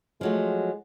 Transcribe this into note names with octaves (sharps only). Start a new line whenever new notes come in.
F3 F#3 G#3 A3